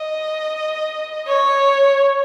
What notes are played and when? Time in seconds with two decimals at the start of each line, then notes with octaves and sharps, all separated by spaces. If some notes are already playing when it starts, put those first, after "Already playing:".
Already playing: D#5
1.27 C#5